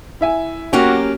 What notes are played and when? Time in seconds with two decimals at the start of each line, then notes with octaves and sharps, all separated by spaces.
0.21 E4 E5 G#5
0.73 F#3 A#3 C#4 F#4 G4 G5